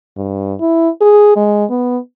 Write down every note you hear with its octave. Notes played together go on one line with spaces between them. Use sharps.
G2
E4
G#4
G#3
B3